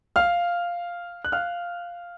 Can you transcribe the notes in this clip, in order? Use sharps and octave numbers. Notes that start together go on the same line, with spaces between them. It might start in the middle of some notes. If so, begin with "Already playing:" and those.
F5 F6
F#6
F5 F6